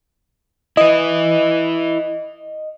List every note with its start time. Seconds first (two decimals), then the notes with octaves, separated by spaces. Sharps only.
0.77 E4 B4 D#5